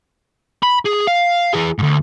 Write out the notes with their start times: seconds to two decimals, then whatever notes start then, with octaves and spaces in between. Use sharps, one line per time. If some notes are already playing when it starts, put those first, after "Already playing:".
0.63 B5
0.86 G#4
1.07 F5
1.53 E3 G#4
1.78 D2 G#2